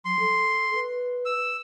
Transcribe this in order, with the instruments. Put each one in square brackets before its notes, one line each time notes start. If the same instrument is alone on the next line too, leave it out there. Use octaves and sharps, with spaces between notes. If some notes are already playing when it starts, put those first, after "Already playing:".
[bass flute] F#3 [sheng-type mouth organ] C6
[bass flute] A4
B4
[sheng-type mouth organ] E6